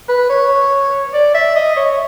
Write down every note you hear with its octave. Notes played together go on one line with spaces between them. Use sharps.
B4
C#5
D5
E5
D#5
C#5